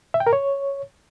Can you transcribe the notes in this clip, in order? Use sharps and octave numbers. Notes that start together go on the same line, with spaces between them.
E5
G5
A#4
C#5